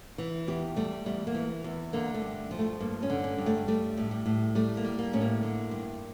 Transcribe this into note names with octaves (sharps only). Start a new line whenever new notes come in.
E3
E2 G4
G3 A3
E2 G3
A#3
E3
E2
D3 A#3
A3
G2
F3
A3
G2 A#3
C#4
D3
C#4
G2
A3
G3 A3
A2
G3
A2
G3 A3
A#3
G3
A#3
A2 C#4
A#3
D3
G2